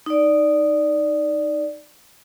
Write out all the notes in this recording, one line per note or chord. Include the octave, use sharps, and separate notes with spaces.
D#4 D5